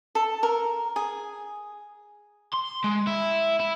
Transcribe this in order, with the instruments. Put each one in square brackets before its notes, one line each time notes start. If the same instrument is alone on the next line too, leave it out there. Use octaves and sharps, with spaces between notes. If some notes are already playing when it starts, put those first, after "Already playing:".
[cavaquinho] A4
A#4
G#4
[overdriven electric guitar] C6
G#3
E4
E4